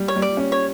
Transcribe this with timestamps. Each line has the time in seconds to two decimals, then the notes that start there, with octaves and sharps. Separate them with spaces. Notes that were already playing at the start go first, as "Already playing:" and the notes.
Already playing: G3
0.08 C#5
0.16 G3
0.22 D5
0.37 C#4
0.52 C#5